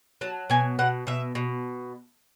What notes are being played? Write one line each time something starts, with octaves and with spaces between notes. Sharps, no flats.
F#3 A5
B2 G#5
B2 F#5
B2 E5
B2